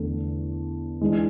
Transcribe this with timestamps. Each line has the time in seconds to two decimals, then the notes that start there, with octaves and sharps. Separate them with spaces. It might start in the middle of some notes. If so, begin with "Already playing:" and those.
Already playing: E2 D3 A3
1.01 E3 G#3 D4